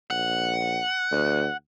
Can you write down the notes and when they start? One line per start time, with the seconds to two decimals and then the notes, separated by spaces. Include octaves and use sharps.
0.10 A#1 F#5
1.12 D2